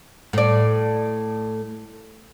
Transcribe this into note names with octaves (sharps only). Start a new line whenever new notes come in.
A2 D5